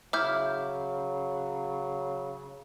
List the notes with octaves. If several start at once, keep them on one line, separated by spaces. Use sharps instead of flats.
C#3 F#3 E4 D6 F6 G6